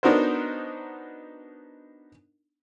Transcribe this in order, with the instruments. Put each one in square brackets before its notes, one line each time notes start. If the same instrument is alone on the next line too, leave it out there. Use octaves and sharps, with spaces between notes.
[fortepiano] B3 D4 D#4 F#4 A#4 C5